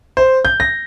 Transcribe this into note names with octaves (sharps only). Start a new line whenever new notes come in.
C5
G6
A#6